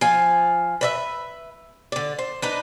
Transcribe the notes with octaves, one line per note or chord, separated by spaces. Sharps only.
F3 F5 G#5
B4 D5 E5
D3 D5
C5
D4 D#4 B4